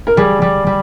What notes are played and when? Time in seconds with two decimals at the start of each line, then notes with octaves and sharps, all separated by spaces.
0.07 A#4
0.17 G3 G#4
0.42 G3
0.67 G3